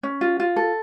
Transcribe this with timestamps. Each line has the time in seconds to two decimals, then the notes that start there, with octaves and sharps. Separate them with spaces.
0.03 C#4
0.21 F4
0.40 F4
0.56 A4